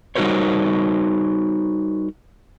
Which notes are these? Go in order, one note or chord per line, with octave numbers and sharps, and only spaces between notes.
G3 D#4 F#4 A#4 C5 C#5